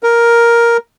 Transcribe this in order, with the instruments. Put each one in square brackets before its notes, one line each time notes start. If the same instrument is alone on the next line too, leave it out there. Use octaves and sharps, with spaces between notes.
[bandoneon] A#4